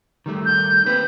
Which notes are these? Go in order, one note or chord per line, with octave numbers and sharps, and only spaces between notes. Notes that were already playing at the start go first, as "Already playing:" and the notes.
D#3 G3 A3
G6
A#3 C4 B4